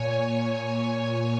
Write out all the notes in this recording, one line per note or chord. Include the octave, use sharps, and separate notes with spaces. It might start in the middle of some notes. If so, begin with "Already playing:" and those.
Already playing: A#2 C#5 G#5